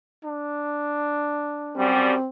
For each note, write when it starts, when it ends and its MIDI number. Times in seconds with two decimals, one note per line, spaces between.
0.24 1.84 62
1.76 2.11 42
1.76 2.11 55
1.76 2.28 60